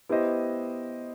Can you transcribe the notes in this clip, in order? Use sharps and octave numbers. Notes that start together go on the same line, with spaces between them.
B3 E4 G4 C5 D#5